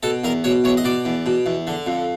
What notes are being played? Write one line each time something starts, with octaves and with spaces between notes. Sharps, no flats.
B2 A4
E2 A#4
B2 C#5
E2 C#5
D#5
B2 D5
E2
B2
E2
D3
F2